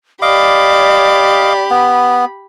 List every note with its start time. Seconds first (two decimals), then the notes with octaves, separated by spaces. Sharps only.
0.22 G4 D5 D#5 F5 B5 D6
1.71 B3